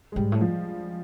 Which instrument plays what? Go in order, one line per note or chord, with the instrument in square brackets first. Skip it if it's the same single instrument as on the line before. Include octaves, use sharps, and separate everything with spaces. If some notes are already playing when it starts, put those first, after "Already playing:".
[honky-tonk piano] G#3
[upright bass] G#2 [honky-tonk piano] G3
[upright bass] A2
[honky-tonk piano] F3